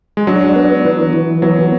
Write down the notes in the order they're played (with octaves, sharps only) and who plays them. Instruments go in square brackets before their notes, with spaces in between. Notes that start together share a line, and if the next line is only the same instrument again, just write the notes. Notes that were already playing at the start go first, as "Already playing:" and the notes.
[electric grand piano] G#3
[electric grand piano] F#3 [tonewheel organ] D4
[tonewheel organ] B3
E3
E3
[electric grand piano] F#3 [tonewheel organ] B3